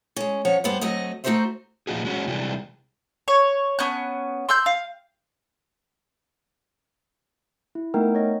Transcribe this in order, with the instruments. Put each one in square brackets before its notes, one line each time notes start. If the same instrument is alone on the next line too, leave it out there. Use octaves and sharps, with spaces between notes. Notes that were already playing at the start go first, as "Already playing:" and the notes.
[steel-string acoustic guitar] G#3 C#4
F3 C#4 C#5 F#5
G2 G3 B3 C5
D2 F#3 A3 C4 D#5
A3 D#4 F#4 A4 C5 E5
[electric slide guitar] A#2 F3 F#3 C4 F#4 G#4
G#3 C#4 F#4
C3 E3 G3 G#3
[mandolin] C#5
B3 C#4 F#6
C6 E6 F#6 G6
F5
[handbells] E4
A3 B3 D#4 A#4 G5
C#5 D#5